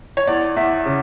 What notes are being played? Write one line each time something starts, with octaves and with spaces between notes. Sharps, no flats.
C#5
E2 D5
E2 E5
C#3